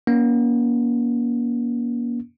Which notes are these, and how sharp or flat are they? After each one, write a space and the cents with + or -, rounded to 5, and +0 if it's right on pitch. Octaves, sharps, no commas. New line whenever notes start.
A#3 +35 C#4 +35